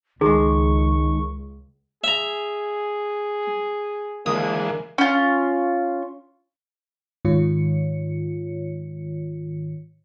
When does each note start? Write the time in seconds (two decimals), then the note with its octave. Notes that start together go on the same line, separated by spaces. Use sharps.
0.21 C#2 D#3 G#3 G#4 C#6
2.04 G#4 E5 A#5
4.26 D3 E3 G#3 A#3 D#6
4.98 C#4 F4
7.25 G#2 D#3 F4 C#5 C#7